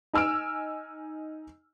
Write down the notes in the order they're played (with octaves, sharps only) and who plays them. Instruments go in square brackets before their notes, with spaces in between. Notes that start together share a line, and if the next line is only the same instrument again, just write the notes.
[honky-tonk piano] D#4 G#5 E6 F6 D7